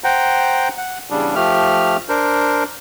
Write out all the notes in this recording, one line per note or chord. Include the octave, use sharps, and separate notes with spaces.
C5 F#5 G5 A#5
F#5
E2 C#3 G3 D4
F3 A3 G4 F6
D4 A#4 C5